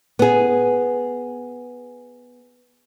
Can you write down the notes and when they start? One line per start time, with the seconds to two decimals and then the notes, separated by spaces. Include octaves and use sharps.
0.19 B3 G#4